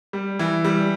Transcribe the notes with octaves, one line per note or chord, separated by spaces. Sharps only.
G3
E3
G3